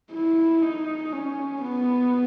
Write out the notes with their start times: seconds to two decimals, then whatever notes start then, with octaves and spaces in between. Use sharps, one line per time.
0.12 E4
0.62 D#4
1.13 C#4
1.62 B3